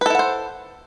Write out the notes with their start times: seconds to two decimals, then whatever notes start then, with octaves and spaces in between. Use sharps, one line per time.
0.01 B4
0.06 A4
0.10 E4
0.15 F#5
0.19 C5